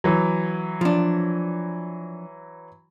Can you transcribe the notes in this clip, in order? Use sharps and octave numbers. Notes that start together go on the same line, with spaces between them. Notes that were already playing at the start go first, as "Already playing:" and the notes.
E3 F#3
F3 D4